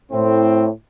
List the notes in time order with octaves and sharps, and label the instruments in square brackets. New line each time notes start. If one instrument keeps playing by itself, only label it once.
[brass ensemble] A2 C4